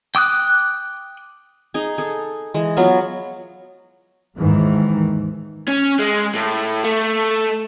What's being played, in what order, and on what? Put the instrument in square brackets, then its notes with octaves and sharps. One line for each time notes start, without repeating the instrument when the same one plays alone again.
[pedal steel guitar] G5 D6 D#6 F#6
[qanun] D#4 G#4
G#4 A4
E3 G#3
F#3 B3 F4 E5
[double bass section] D#2 G#2 D#3 E3
[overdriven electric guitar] C#4
G#3
A2
A3